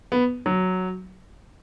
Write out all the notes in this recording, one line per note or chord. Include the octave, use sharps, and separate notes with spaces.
B3
F#3